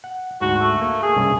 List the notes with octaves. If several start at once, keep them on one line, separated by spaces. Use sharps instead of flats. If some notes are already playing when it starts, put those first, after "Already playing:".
F#5
D2 G#2 F#4
A3
A#3
G#4
C2 G2 C#3